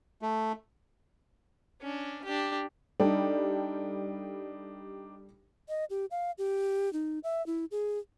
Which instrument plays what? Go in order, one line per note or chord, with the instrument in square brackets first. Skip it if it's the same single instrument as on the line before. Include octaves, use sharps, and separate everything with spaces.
[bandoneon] A3
[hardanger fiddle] C#4 D4
D4 G4
[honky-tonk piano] G3 G4 A4 [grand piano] D4 D#4
[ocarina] D#5
G4
F5
G4
D#4
E5
E4
G#4